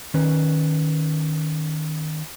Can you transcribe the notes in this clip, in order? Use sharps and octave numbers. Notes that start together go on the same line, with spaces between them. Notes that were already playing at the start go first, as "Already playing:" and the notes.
D#3 C#4 B4